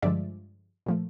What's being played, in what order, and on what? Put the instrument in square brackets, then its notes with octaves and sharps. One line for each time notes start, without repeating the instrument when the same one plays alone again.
[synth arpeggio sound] G2 D3 F3 G#3 D5 E5
A#2 F3 A3